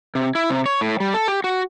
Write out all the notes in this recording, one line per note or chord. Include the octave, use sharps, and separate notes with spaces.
C3
E4
C3
C#5
A2
G3
A4
G4
F#4